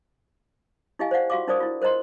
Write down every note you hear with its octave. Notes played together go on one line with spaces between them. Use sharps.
D#4 E4 G4 D#5 F5 G#5
C5 D5 F5 F#5
F4 F#4 F5 C#6 D6
D4 D#4 A#4 C5 D5 D#6
E4 F4
A#4 C5 D#5 A#5 C6